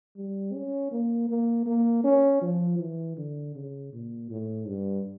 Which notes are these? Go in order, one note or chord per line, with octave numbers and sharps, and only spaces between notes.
G3
C#4
A#3
A#3
A#3
C#4
F3
E3
D3
C#3
A#2
A2
G2